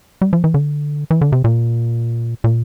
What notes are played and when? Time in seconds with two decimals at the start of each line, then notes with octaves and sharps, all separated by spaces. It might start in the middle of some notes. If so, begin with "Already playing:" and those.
0.22 G3
0.33 F3
0.44 E3
0.54 D3
1.11 E3
1.21 D3
1.32 C3
1.44 A#2
2.44 A#2